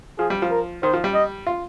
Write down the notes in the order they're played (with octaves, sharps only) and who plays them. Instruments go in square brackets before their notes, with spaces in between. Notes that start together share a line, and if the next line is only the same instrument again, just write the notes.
[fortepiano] F3 [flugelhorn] G#4
[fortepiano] G3
F3
[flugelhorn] A#4
[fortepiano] D#3 [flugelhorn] C5
[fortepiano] F3
G3
[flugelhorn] D#5
[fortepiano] F4